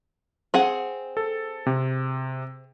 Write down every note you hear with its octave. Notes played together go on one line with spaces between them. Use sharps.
C4 G#4 F#5
A4
C3